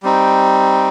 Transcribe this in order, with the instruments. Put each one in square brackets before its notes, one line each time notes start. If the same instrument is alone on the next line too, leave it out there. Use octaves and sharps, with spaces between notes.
[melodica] G3 C4 D#4